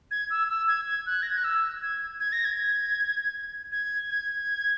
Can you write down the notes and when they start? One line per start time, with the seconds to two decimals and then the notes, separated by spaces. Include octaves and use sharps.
0.11 G#6
0.30 E6
0.49 E6
0.68 G#6
0.88 G#6
1.06 F#6
1.22 A#6
1.30 G#6
1.37 F#6
1.44 E6
1.82 G#6
2.20 G#6
2.33 A#6
2.45 G#6
3.72 G#6
4.10 G#6